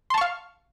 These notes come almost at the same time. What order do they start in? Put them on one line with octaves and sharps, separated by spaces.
C6 A5 C#6 F5